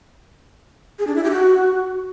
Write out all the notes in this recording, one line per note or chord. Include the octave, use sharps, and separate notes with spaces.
G#4
D4
E4
G4
F#4